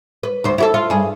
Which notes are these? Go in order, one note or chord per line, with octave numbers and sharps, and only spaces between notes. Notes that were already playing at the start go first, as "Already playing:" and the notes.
B4
D2 C5
E4 F#4 A4
F4
G2 G#4